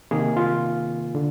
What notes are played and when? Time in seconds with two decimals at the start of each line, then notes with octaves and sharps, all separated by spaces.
0.11 C3 D#3 A#3 G#4
0.37 F4
1.15 D3